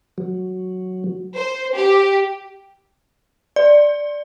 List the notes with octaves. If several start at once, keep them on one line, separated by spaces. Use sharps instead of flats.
F#3
C5
G4
D5